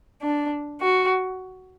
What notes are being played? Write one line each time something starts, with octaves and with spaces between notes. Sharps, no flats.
D4
F#4